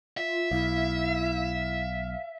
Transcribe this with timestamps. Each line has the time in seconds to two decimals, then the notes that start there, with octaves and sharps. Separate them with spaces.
0.17 F4 E5
0.51 B1 E4 F5